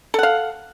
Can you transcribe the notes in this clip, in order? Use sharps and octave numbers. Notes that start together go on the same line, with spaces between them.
A4 F5 F#5